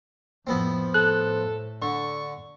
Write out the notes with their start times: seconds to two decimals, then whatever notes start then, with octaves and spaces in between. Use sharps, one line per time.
0.47 F2 A2 F3 B3 C4
0.94 A2 A4 F#6
1.82 D3 C#6